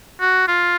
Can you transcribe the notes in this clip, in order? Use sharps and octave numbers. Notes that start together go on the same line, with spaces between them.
F#4
F4